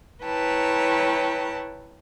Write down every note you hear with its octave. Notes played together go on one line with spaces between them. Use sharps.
E4 B4 C#5 G5 A5 A#5